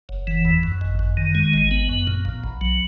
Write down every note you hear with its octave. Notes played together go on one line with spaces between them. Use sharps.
F#1
E3
E2
F#2
G#1
F#2
D#3
G#3
G#1
B3
F#2
A#2
A#1
B1
F#3